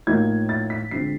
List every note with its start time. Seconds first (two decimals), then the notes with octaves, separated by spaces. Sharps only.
0.07 A2 F3 A#3 D#4 G#6
0.49 A6
0.70 B6
0.91 D3 F3 G#3 C4 C7